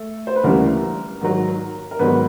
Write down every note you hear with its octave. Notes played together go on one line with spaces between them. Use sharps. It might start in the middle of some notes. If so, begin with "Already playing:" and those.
Already playing: A3 A4
C5
B4
D2 C#3 E3 G3 A#3 A#4
G#2 D#3 F#3
A#4
G#2 D#3 F#3 B3 B4